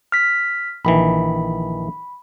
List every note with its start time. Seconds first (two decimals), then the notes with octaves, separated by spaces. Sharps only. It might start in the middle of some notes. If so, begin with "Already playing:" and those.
0.12 F6 B6
0.85 A#1 D#3 E3 B5